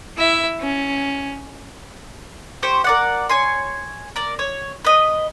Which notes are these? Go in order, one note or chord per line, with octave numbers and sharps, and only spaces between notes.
E4 E5
C#4
G4 C5 C#6
A#4 D5 F#5
C#5 G#5 C6
A#4 D5
C#5
B4 D#5